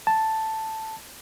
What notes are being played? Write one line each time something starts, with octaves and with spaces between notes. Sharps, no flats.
A5